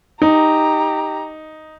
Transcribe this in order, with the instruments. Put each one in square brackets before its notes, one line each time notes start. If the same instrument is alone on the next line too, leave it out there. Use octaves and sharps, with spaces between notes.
[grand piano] D#4 [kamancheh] G4 A#5